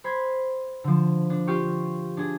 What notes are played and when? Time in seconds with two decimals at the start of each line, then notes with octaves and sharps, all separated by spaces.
0.04 C5 B5 G#6
0.84 D3 F3
1.30 D4
1.47 F4 G4 C#6
2.17 D4 G#4